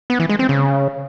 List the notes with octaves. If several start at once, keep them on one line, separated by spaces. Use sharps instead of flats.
B3
E3
G#3
C4
C#3